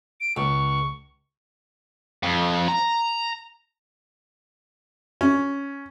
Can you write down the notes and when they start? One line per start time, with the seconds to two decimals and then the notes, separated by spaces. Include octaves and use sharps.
0.20 D7
0.37 C#2 C#6
2.23 F2
2.68 A#5
5.21 C#4